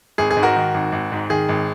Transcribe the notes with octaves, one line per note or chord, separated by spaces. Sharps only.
G#1 G#4
G#4
G#2
F#4 A#4
D#3
G#1
G#1
G#2
D#3 G#4
G#1